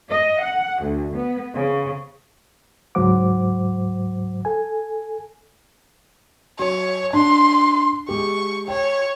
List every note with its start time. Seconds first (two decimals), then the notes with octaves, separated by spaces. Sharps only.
0.11 D#5
0.41 F#5
0.82 D2
1.16 B3
1.54 C#3
2.95 C#2 G#2 F#3 C5 F#5 D6
4.45 A4 G#5
6.59 F#3 C#5
7.13 D4 C6
8.09 G#3 G4 C#6
8.68 C#5 G5